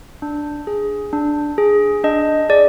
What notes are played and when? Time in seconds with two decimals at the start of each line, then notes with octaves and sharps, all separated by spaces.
0.22 D4
0.67 G#4
1.13 D4
1.58 G#4
2.04 D4 D#5
2.49 G#4 D5